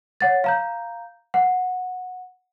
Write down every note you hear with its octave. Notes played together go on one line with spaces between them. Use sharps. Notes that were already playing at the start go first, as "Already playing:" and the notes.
C#5 F#5 A6
F5 A#5 G6
F#5